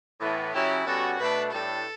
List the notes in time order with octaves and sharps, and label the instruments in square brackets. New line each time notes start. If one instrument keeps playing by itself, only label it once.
[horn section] A2 E3 B3
[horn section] C#3 F#3 C#4 E4 [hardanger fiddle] G4
[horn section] B2 G3 C#4 F#4 [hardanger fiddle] A4
[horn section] B2 A3 D4 [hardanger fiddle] B4
[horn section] A2 G3 D4 [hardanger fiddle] A4